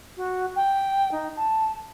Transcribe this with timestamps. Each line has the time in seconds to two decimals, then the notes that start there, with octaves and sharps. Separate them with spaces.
0.17 F#4
0.56 G5
1.12 D#4
1.37 A5